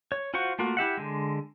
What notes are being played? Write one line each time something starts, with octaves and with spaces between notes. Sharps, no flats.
C#5
F4 F#4 C5 F#5 C#6
A3 A#3 F4 F#4
E4 G4 E5 F#5
D3 G#3